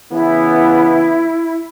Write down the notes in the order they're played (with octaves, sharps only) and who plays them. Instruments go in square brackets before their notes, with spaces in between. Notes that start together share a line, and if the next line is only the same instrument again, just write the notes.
[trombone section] C#3 E3 B3 [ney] E4